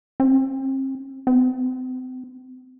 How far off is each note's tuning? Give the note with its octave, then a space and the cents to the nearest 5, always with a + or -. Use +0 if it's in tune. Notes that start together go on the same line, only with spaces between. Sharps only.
C4 +40
C4 -40